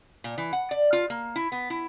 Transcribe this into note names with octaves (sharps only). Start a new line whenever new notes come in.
A#2
E3
F#5
D5
F4
A#3
E4
B3
E4